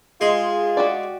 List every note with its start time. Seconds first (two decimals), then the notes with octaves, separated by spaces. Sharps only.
0.21 G#3 F4 G#4 C6
0.77 F#4 G4 D5